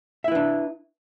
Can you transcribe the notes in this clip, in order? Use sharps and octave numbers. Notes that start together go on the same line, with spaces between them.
D4 E4 B4 E5